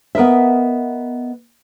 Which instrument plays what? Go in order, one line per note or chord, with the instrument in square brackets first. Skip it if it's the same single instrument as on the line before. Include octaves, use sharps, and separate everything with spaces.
[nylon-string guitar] B3 A#4 D#5 E5